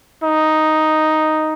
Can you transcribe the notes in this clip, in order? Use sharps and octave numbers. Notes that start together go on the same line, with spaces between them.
D#4